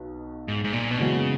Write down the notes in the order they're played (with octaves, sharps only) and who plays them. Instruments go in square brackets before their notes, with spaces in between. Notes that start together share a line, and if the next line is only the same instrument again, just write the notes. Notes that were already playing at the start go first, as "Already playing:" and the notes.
Already playing: [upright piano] B1 B2
[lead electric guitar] G#2
G#2
A#2
B2
[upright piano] F#2 E3 G#3 B3 F#4 [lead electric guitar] C#3